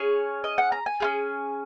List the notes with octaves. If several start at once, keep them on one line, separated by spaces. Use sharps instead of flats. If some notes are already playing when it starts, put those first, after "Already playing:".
Already playing: C#4 G#4 C#5
D#5
F#5
A#5
G#5
C#4 F4 G#4